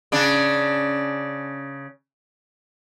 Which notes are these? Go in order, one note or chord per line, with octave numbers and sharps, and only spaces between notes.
C#3 D4